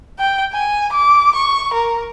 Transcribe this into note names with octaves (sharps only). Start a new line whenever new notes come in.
G5
G#5
D6
C#6
A#4